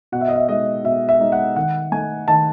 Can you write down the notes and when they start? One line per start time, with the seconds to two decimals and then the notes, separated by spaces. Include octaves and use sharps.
0.12 B2 F#5
0.21 E5
0.28 D#5
0.36 E5
0.49 G#3 D#4 D#5
0.84 B2 E5
1.09 E5
1.20 G#3 D#4
1.32 F#5
1.56 D#3 F#5
1.92 A3 D#4 G#5
2.28 D#3 A5